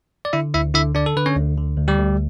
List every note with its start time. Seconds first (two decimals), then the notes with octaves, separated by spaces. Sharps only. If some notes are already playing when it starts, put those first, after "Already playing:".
0.25 D5
0.33 D3 E4 E5
0.54 D2 E4 E5
0.74 D3 E4 E5
0.95 D3 D4 D5
1.06 A4
1.16 D3 B4
1.26 C#4 C#5
1.36 D2
1.58 D3
1.78 D2
1.88 G3 G4
1.99 D2